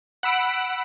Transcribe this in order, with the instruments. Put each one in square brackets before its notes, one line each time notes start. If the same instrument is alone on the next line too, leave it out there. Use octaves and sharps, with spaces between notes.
[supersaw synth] F#5 B5 E6 D7